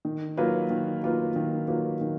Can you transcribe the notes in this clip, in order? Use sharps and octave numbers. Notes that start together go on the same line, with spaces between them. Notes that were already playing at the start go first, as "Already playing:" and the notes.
D#3
F#3 A#3 F4 B4
D#3
F#3 A#3 F4 B4
D#3
F#3 A#3 F4 B4
D#3